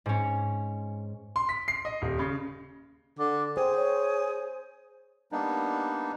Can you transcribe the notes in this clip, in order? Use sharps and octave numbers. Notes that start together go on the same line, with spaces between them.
G#2 C#4
C6
B6
C7
D#5
D#1
C#3
D3 D6
G#4 C5 G5
C#5
G3 A#3 B3 D4 D#4